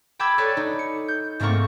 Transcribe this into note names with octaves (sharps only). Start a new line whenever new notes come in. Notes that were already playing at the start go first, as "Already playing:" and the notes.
G5 A5 B5 D6 E6 G#6
A4 B4 C#5 D5
D#4
C#7
G6
G#2 A3 A#3 C4 A#4 C#6